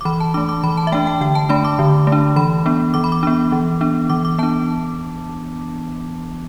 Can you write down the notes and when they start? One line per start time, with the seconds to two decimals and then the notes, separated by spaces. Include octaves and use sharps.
0.01 D6
0.05 E3 B5
0.20 A5
0.34 A3 D4 D6
0.49 D6
0.64 E3 B5
0.77 A5
0.87 E5
0.92 A3 D4 G5
1.07 G5
1.21 D3 G5
1.35 A5
1.49 A3 D4 B5
1.65 D6
1.79 D3
2.07 A3
2.12 D4
2.36 E3 B5
2.66 B3 D4
2.94 E3 D6
3.04 B5
3.12 D6
3.23 B3 D4
3.52 E3
3.81 B3 D4
4.09 E3 D6
4.25 D6
4.38 B3 D4 A5